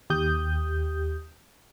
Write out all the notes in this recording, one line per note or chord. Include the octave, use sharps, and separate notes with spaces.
D#2 G4 D#6 G6